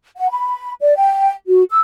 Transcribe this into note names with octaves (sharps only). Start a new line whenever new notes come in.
F#5
B5
D5
G5
F#4
E6